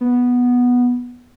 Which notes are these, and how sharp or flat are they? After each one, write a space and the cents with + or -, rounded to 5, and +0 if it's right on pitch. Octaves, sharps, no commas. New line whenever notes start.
B3 -5